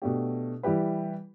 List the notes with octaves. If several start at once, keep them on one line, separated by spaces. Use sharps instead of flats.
B2 A3 D4 G4
E3 G3 E4 G4 B4